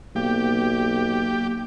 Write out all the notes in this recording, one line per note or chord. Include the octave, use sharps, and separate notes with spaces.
B1 A#3 G4